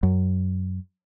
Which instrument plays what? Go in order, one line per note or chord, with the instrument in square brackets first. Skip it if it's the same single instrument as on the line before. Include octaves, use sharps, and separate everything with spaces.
[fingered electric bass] F#2